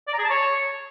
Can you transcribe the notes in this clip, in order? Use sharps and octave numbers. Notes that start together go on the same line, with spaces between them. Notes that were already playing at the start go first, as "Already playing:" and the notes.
D5
A#5
G#4
A5
C#5